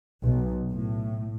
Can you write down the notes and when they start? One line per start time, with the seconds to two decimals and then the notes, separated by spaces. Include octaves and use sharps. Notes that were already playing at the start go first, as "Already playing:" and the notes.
0.22 B1
0.69 A2